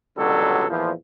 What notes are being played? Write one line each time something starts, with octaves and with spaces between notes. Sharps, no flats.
C#2 B2 D3 F#3 G3 A4
E2 A#2 E3 F3